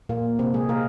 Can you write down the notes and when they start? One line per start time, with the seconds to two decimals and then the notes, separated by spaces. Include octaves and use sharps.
0.09 A#2 A#3
0.39 C3 C4
0.54 G#3 G#4
0.69 A#3 A#4